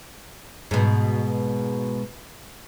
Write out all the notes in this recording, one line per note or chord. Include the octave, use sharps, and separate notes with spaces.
G#2 B2